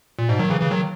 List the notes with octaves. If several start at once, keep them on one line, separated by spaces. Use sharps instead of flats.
A#2
G#2 B2
D#3 F#3
C#3 E3
C#3 E3
D#3 F#3